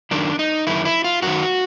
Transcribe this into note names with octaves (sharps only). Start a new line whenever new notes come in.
F#2 D#3 D4
D#4
F#2 D#3 E4
E4
F4
F#2 D#3 F#4